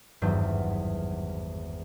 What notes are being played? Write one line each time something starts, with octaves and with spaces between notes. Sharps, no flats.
G#1 E2 G2 F#3 G6